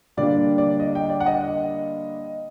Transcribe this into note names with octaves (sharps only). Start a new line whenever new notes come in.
D3 G3 A#3 D4 D5
D5
D#5
G5
D5
F#5
D#5